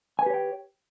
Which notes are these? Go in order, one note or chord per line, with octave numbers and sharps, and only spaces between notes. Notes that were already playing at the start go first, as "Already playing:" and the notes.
G4 B4 C#5 G5 G#5